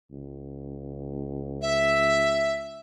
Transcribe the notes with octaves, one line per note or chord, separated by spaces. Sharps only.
C#2
E5